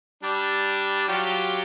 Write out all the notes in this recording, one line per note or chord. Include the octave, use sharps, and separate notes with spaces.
G3 D4
F#3 F4 G4